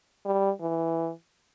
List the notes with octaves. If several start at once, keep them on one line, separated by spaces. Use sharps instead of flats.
G3
E3